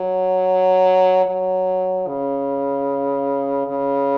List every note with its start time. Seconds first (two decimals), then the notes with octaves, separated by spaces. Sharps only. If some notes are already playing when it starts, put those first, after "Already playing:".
Already playing: F#3
1.26 F#3
2.07 C#3
3.68 C#3